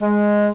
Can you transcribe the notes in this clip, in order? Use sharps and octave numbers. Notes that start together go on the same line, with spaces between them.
G#3